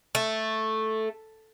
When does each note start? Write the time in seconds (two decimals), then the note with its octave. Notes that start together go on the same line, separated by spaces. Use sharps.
0.15 A3